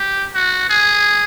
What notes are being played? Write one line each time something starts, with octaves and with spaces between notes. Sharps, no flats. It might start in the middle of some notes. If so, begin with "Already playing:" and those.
Already playing: G4
F#4
G#4